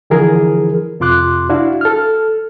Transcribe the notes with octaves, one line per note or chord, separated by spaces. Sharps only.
D3 E3 F3 E4 G#4 A#4
F2 C3 F4 C6 D6 F#6
D4 E4 F#4 F5
A4 F6